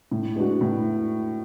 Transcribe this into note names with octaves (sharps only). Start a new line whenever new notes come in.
A2
G#3 B3 D4 F#4
A2